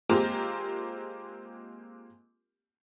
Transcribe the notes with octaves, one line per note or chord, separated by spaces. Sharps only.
G#3 A#3 C4 F4 G4 A#4